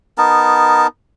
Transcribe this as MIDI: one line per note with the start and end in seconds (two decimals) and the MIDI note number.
0.18 0.87 59
0.18 0.87 63
0.18 0.87 70
0.18 0.87 81